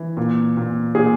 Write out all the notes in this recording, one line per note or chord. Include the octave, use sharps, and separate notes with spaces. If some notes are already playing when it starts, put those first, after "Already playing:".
Already playing: E3
A#2
A#2
A#2 G#4